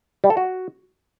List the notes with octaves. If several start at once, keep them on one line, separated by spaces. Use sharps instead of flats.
G3
A4
F#4